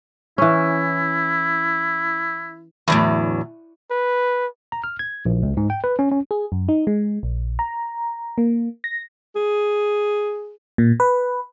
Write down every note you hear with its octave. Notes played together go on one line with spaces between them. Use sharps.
E3 C#4 E4
E2 A2 D3 F#3
B4
A#5
F6
G#6
A#1
C#2
G#2
G5
B4
C#4
C#4
G#4
F#2
D#4
G#3
A#1
A#5
A#3
A#6
G#4
A#2
B4